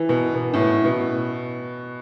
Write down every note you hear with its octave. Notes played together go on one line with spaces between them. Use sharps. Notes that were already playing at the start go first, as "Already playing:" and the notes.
Already playing: E3
B2
B2
A2
B2
B2